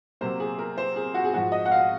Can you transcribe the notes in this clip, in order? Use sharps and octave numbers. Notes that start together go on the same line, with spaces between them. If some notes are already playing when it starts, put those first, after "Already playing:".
C3 F#3 A#3 C5
G#4
A#4
C5
G#4
F#4
G#4
G#2 F3 G#3 F#4
D#5
F#5
F5